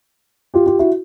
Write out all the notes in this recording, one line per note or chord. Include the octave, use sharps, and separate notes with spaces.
F4 G4
F4 G4
E4 F#4